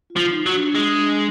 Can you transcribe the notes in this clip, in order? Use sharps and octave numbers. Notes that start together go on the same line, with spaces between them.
F4
F3
D#4
F#3
D4
G#3